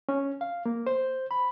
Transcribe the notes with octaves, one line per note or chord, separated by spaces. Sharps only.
C#4
F5
A#3
C5
B5